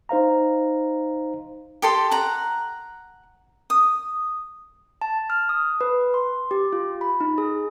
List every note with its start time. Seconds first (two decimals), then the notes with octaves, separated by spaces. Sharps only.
0.09 D#4 C5 F5 A#5
1.82 G4 A4 C6
2.11 F#5 A#5
3.70 D#6
5.02 A5
5.30 F6
5.49 D#6
5.81 B4
6.14 C6
6.51 G4
6.73 F4
7.01 B5
7.21 D#4
7.38 G#4